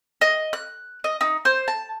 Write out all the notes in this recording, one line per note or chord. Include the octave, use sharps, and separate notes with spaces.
D#5
F#6
D#5
D#4
C5
A5